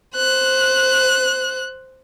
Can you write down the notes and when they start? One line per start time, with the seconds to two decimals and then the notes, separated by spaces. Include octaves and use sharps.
0.16 C5 F#6